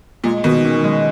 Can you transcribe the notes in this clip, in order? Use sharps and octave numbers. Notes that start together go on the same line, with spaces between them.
A#2 G#3
B2 D#3
C#4
G#3